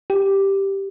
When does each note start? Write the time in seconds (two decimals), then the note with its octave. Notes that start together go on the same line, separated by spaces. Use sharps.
0.10 G4